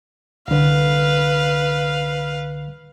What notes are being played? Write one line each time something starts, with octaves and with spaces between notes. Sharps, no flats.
C2 D3 B4 F5